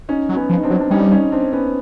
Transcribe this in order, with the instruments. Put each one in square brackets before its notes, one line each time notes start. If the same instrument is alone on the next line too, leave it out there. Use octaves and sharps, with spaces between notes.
[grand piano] C#4 D#4
[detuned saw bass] F#3
[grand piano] B3 C#4
[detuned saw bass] F3
[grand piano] D#4
C4 D4
[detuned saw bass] F#3
[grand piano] D4
[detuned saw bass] G3 [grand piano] C#4 D#4
[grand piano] C#4 D#4
C4 D4
B3 C#4